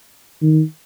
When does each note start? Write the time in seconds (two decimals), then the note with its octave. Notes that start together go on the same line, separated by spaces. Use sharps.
0.42 D#3